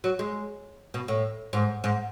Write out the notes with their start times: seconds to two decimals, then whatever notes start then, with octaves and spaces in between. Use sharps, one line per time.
0.04 F#3
0.19 G#3
0.94 B2
1.08 A2
1.53 G#2
1.84 G#2